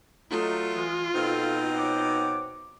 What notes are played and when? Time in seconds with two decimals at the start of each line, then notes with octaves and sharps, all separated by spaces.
0.31 F#3 G#3 A3 D#4 F4
0.72 E3 G#3
1.14 B2 C4 D#4 A4 F5
1.74 C#5 F#5 D6